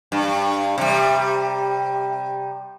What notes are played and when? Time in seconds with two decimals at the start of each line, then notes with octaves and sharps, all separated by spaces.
0.12 G2
0.78 C3 G3